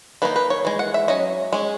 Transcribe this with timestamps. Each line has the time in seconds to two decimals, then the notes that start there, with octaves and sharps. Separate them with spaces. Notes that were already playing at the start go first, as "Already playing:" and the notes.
0.22 D#3 A#3 D#4 B4
0.36 B4
0.50 C#5
0.65 E3 G#3
0.79 F#5
0.94 E5
1.08 F#3 C#4 D#5
1.53 G#3 C#4